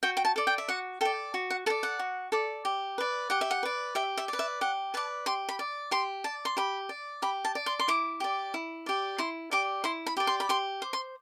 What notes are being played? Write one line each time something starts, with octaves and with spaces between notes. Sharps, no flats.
F#4 G5
G5
A5
A4 D5
G5
E5
F#4 F#5
A4 D5 G5
F#4
F#5
A4 D5 A5
F#5
F#4
A4 D5
G4
B4 D5
G4 F#5
E5
F#5
B4 D5
G4 E5
E5
B4 D5
E5
G4 F#5
B4 D5 A5
G4 C6
B5
D5
G4 C6
D5 A5
C6
G4 B5
D5
G4 B5
A5
D5
C6
C6
E4 D6
G4 D5
E4
G4 D5
E4 C6
G4 D5 D6
E4 C6
B5
G4 D5
C6
B5
G4 C6
C5
C6